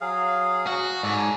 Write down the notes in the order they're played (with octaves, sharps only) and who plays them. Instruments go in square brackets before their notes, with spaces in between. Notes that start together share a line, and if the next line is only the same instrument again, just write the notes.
[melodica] F#3 G#4 F5
[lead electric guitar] F#4
[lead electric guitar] G#2 [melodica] A4 D5
[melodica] C#5 A5